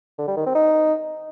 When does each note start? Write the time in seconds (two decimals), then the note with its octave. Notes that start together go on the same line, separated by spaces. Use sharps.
0.19 D3
0.28 G3
0.37 D#3
0.46 C4
0.55 D#4